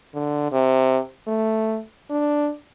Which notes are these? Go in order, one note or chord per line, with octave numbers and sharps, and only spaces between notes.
D3
C3
A3
D4